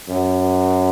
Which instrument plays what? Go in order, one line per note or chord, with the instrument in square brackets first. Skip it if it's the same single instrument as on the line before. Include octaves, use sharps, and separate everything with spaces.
[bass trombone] F#2